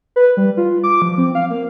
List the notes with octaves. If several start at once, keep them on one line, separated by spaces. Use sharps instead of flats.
B4
G3
F4
D6
F3
C4
F5
A#3